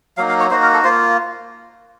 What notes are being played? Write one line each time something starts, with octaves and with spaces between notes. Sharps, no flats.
F#3 A#3 D#4 F5
F5
C#5
A#3 D#4 F#4 C5
A#4
A4
A#3 F4 C5